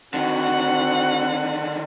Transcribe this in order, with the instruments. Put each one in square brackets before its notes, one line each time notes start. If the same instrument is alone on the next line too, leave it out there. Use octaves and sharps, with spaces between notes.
[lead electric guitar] D3 D#3 [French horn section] C4 [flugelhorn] F#4 [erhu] F#5